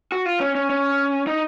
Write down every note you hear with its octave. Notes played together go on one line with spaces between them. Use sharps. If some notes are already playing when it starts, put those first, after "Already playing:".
F#4
F4
C#4
C#4
C#4
D#4